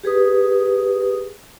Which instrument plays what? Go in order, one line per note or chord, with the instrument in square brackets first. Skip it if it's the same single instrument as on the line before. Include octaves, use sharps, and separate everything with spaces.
[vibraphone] G4 G#4 B4 D#6